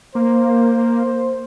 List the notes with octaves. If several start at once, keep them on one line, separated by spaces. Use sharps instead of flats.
A#3 C5